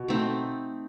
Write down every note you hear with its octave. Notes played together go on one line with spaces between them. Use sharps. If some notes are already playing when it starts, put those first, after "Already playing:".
Already playing: B2
A3 C4 D#4